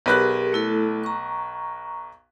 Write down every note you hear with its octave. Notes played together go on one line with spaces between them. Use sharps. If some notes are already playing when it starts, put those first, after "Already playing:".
B1 G4 G#4 A#4 B4 F#6
A3 E4 A4
A#5 C#6